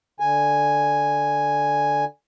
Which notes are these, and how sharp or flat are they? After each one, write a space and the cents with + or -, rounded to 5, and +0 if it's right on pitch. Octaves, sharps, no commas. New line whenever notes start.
D3 +0 G#5 +0